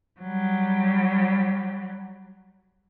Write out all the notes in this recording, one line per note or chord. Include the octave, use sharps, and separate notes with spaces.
F#3 G3